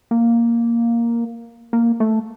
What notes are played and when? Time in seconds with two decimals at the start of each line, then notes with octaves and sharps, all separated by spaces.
0.11 A#3
1.73 A#3
2.00 A3